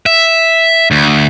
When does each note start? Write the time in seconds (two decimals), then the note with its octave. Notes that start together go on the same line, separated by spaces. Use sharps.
0.06 E5
0.91 D2